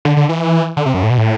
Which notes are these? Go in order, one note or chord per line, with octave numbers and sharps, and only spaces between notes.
D3
D3
E3
D3
C3
F#2
A2
B2
A2